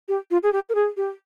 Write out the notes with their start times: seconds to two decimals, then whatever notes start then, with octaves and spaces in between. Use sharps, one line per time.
0.08 G4
0.31 F4
0.43 G#4
0.53 G4
0.69 A#4
0.75 G#4
0.97 G4